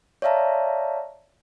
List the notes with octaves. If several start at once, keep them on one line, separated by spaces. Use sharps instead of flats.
C#5 D5 E5 F5 A5 A#5